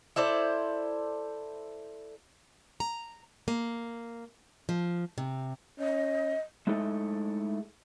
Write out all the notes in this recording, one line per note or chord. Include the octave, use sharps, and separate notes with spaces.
E4 A4 C5 D5
A#5
A#3
F3
C3
C#4 D#5
G#3 A3 D#4 E4 G#4 A4